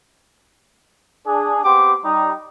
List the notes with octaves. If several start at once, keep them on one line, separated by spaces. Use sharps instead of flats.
D4 G#4
B3 C4 G4 C6 D6
G3 D#4